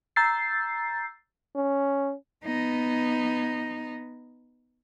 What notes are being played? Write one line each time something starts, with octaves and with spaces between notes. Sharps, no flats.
A#5 E6 G6 A6 C7
C#4
B3 D#4